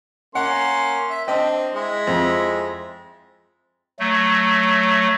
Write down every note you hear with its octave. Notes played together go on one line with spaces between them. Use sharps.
A#3 C#4 F#5 C6
E5
C4 D4 D#5 G5
G#3 E4
F2
F#3 A3